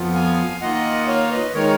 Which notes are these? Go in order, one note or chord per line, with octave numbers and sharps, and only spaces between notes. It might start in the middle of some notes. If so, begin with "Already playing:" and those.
Already playing: F2 F3 B3 F4
F5 G#5
D#3 A#3 F4 D#5 F#5
C#5 F5
B4 D#5
D#3 G#3 D#4 A#4 C#5